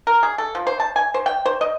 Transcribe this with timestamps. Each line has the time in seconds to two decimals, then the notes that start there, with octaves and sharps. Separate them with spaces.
0.07 A#4
0.23 G#4
0.38 A4
0.55 F3
0.67 C5
0.80 A5
0.96 G#5
1.14 C5
1.26 G5
1.45 C5
1.61 D#5